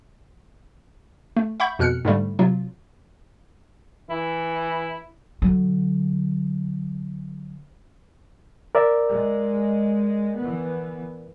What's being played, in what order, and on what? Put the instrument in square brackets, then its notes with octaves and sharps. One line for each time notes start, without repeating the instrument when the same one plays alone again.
[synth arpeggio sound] A3
E5 F#5 B5 C#6 G6
F2 B2 F6 F#6 C#7
G#2 D3 G3 A3
C3 F#3 F4
[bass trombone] E3 [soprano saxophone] E4
[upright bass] D3 F#3
[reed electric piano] A#4 D5 E5
[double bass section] G#3
E3 B3